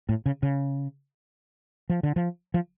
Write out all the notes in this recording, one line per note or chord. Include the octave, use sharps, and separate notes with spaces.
A2
C#3
C#3
F3
D3
F3
F3